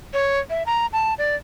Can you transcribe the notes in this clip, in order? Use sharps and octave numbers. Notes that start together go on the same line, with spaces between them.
C#5
E5
A#5
A5
D5